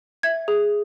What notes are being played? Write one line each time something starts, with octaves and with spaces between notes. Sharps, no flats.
E5 G#6
G#4